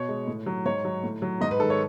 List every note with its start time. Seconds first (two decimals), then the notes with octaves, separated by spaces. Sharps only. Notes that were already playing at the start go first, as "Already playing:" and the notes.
Already playing: B2 C#5
0.09 G#3
0.27 A2
0.46 F#3
0.65 G#2 C#5
0.85 F#3
1.03 A2
1.22 F#3
1.41 G#2 D#5
1.51 B4
1.60 D#3 A4
1.63 G#3
1.70 C#5